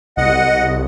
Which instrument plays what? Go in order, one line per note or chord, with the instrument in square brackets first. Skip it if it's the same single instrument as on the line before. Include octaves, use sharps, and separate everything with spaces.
[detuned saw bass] C2 [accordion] D#5 F#5